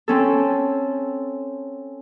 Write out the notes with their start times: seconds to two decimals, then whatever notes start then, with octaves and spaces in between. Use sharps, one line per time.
0.08 C4 C#4 A4